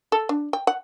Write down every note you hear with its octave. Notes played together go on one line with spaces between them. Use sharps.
A4
D4
G5
F#5